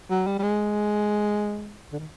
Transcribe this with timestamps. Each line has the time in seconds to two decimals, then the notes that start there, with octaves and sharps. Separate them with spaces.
0.10 F#3
0.27 G3
0.39 G3
0.43 G#3
1.92 D3
1.99 D#3